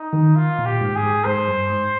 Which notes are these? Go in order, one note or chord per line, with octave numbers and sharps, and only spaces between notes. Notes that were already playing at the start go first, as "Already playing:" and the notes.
Already playing: D#4
D#3
F4
A#2
G4
G#2
G#4
G#2
G#2 C5
G2
G#2